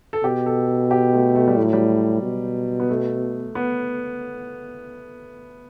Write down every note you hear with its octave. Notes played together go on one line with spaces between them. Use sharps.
A4
B2 G4
A4
G4
A3
A3
G3
A2 F#3
G3
B2
B3
A3
B3